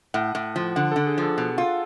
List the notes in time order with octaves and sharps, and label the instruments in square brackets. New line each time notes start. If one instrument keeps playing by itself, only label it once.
[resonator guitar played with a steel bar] A2 [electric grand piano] F#5
[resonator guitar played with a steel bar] A2
F3
[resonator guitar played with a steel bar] D3 [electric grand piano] F#5
[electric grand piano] A4
[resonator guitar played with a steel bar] D3
[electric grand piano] G#4
[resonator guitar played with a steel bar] F3 [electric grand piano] A4
[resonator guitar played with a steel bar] B2
F4